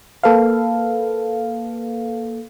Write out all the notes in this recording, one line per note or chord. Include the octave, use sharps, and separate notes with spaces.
A#3 A4 B4 F5